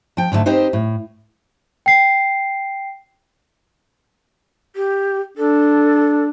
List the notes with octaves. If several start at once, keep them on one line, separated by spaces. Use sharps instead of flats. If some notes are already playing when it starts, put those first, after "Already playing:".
F3 G5
G#2 D3 F#3 A3
C4 D#4 G4 B4 C5
A2
G5 C7
G4
D4 A4